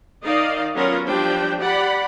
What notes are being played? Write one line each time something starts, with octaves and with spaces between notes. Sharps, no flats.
D#3 D#4 D5 D#5 F5
F#3 B3 C#4 F4 A#4 C#5
F3 G3 D4 G4 C5 G5
G4 D5 F#5 B5